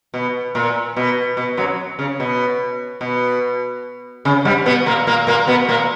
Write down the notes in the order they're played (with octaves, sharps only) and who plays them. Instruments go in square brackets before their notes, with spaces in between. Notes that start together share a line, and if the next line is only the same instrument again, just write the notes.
[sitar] B2
A#2
B2
B2
F#2 F#3
C#3
B2
B2
C#3
G2 G3
B2 B3
A#2 A#3
A#2 A#3
A#2 A#3
B2 B3
A#2 A#3